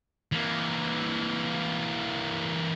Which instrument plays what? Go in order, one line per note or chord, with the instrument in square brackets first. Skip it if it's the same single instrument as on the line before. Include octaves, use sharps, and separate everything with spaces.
[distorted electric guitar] E3 A#3